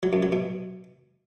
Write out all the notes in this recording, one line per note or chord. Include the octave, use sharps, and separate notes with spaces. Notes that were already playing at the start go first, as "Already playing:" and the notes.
F#3
F#2
F#3
B2